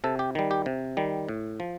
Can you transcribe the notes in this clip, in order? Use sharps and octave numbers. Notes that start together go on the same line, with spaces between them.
C3 A4
G4
D#3 G3
G4
C3
D#3 G3
A2
F3